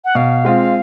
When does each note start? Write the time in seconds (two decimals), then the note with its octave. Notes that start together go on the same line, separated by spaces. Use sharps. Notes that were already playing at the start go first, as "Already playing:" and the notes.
0.05 F#5
0.15 B2 F5
0.45 G#3 C4 F4